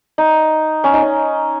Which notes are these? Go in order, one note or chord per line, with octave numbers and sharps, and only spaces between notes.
D#4
C#4
D#4
C#4